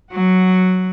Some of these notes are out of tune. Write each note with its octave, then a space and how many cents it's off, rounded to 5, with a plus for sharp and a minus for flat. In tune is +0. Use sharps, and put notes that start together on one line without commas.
F#3 +0 F#5 +0